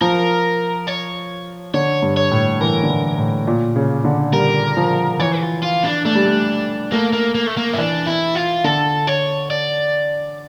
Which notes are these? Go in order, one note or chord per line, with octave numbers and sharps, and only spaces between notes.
F3 A#4
C#5
D3 C#5
G2
C#5
A2
E3 A#4
D3
E3
A2
A#2
C#3
D3
G3 A#4
F3
E3 C#5
F4
F4
D4
A3 D4
G3
A3
A3 A#3
A#3
A#3
A3
A#3
E4
E3 D4
E4
F4
D3 A4
C#5
D5